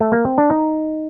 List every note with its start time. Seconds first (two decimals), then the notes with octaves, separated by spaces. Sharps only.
0.00 A3
0.12 A#3
0.25 C4
0.38 D4
0.50 D#4